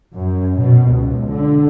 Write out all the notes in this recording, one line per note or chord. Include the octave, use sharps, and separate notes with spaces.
F#2
B2
C#2
D3